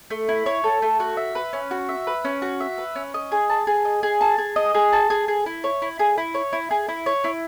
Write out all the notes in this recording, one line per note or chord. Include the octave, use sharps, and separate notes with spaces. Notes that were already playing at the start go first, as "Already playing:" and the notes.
A3
E4
C#5
A4
A3
F#4
E5
B4
C#4
F#4
E5
B4
C#4
F#4
E5
B4
C#4
D#5
G#4
A5
G#4
D#5
G#4
A5
G#4
D#5
G#4
A5
G#4
G#4
E4
C#5
E4
G#4
E4
C#5
E4
G#4
E4
C#5
E4